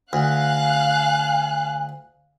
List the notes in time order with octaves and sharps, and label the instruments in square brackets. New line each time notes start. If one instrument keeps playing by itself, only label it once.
[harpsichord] D2 [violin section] F5 F#6 [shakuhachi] G#5